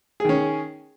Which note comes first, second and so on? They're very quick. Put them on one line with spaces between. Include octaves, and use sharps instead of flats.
G#4 D#3 C#4